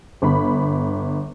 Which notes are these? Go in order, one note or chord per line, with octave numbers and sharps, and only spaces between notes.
G1 B5